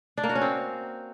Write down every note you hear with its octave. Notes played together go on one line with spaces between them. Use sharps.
D4
A#3
F#4
C#4
C4